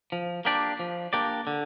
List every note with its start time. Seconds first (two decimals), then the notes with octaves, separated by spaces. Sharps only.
0.12 F3
0.45 A#3 D4 G4 D5
0.79 F3
1.13 A#3 D4 G4 D5
1.47 D3